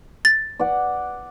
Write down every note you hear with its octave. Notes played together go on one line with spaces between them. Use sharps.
A6
D5 F#5